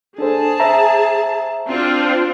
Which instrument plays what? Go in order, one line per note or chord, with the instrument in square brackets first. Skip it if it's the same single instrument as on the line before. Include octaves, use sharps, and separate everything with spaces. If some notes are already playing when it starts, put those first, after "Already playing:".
[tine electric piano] D4 A4 C5 [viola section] G#4 A5
[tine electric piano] C5 E5 A#5
[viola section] C4 D4 F4